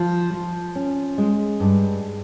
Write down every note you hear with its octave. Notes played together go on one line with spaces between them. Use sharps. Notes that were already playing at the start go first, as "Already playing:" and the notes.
Already playing: F3
F3
C#4
G#3
G2